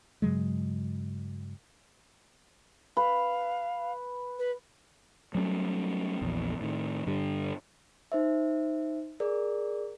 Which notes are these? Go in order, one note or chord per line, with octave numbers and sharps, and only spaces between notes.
G2 C#3 F#3 G#3
B4 F5
B4
F#3 G3 A3 C#4
A#1 E2
A2 D#3
G2 D3 G3
D#4 C5 E5
G#4 A#4 D5